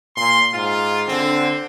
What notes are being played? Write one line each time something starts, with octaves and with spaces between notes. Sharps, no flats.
A#2 C6
G#2 F4
D3 C4